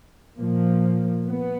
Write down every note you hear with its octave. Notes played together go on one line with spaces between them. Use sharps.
A#2 F3 A#3
B3